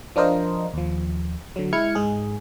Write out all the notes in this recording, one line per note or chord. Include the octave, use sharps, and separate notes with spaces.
F3 D4 F4 A#4 C5 D#5
D#2 F3
D3 F#3
G#3 E4 F6 G#6 C#7
G#2 G#3 G#4